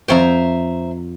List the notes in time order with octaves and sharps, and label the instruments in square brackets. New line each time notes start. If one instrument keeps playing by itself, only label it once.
[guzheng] F2 C#5 G5 [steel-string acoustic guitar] C5 E5 A#5